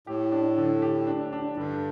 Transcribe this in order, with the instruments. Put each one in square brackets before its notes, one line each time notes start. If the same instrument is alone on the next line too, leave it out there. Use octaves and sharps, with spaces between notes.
[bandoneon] A2 [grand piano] G4
[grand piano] D4
D3
G4
D4
D4
[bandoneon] G2 [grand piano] D3